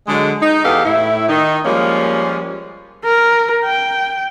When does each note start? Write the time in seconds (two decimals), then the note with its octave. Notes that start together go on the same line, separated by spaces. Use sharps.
0.08 D3 F#3 G#3
0.42 D#4
0.64 E2 B3 G4 A4 F5
0.85 A2 E4
1.29 D#3 D#4
1.65 F3 G3 G#3 A#3 C#4
3.05 A#4
3.65 G5